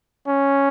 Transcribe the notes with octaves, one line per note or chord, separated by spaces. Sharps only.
C#4